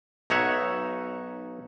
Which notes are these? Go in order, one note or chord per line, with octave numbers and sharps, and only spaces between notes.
B1 D#4 C#5 E5 F#5